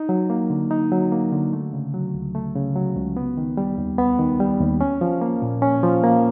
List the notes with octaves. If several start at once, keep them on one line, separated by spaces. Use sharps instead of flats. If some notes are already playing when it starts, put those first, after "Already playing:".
Already playing: D#4
F#3
A#3
D3
D#4
F#3
A#3
D3
A3
C#3
F#3
C#2
A3
C#3
F#3
C#2
B3
D#3
G3
D#2
B3
D#3
G3
D#2
C#4
F3
A#3
A#2
C#4
F3
A#3